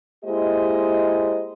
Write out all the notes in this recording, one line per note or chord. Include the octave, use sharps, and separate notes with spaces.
G#3 A#3 E4 G4 C5 D#5